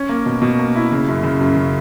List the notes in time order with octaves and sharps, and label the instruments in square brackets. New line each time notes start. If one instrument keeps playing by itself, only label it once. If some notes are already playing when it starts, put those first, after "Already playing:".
Already playing: [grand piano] C#4
A#3
B2
B2
A#3
E4
C#3
F#2
C#3
F#2
C#3